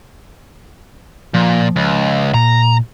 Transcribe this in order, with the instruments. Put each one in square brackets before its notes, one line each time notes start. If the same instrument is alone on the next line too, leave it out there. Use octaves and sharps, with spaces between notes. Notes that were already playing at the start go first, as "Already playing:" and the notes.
[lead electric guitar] A#2 [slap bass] F3
[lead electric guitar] C#2
[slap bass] A#2 [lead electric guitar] A#5